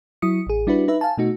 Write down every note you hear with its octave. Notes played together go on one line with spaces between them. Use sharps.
F#3 E4 D#6 C#7
A1 G#4
G3 D4 E4 F#4 B4
D#4 B4 E5
F5 G#5 A5
B2 A3 D#4 F#4